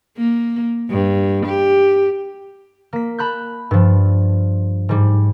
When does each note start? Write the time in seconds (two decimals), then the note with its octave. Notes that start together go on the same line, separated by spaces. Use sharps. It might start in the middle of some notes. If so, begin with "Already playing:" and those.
0.17 A#3
0.90 G2
1.46 G4
2.93 A#3 B6
3.19 A5 B5 F#6 G6
3.71 G2 F3
4.89 G#2 G3